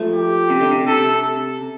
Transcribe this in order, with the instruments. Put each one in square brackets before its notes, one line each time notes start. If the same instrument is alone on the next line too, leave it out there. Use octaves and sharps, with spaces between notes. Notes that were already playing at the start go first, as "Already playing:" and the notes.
Already playing: [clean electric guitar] F3 A3
[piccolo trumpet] G4
[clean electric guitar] C3
D3
C3
[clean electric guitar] C3 [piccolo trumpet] A4